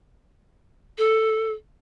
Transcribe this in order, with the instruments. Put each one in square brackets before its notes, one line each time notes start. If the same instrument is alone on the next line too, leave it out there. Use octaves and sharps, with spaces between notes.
[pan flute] A4